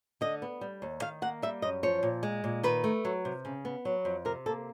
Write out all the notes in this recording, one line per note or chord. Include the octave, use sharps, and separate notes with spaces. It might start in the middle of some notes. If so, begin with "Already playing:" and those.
D3 D#5
B3
G3
D#2
D#3 F5
A#3 F#5
G3 E5
F#2 D#5
F3 C#5
A#2
G#3
A#2
D#3 B4
A3
F#3
C3
C#3
B3
F#3
F2
C3 A#4
A#3 A4